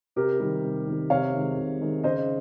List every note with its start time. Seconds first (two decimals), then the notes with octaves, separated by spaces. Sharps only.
0.16 C3 G4 A#4
0.40 D#3 G3
0.64 C3
0.87 D#3 G3
1.10 C3 C#5 F5
1.34 D#3 G#3
1.57 C3
1.81 D#3 G#3
2.04 C#3 C5 D#5